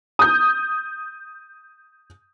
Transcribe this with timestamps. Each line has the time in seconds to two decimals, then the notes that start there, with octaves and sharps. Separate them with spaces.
0.19 D#6 G6